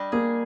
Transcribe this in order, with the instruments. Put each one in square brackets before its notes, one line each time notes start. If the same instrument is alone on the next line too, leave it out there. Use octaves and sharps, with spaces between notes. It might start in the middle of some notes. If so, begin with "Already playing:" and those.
Already playing: [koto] G3 D4 D#5
[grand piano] A#3 [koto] G#4